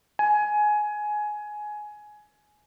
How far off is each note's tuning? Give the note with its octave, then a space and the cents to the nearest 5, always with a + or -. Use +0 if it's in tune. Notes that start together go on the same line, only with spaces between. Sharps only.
G#5 +15